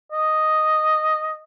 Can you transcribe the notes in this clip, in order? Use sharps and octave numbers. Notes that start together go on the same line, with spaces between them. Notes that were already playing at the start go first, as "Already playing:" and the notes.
D#5